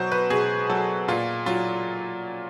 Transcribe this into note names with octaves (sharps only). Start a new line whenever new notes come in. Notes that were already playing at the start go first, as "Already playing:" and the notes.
Already playing: B2 F#3 C5
B4
B2 G#4
F#3 A4
A#2 F4
F#3 F4